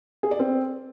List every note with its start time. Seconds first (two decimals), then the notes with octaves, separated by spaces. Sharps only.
0.23 G#4
0.31 D5
0.39 C4